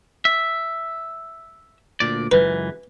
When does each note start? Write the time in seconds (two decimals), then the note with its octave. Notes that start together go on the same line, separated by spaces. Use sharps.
0.25 E5
2.00 D2 A#2 D5
2.32 C#2 F#2 E3 B4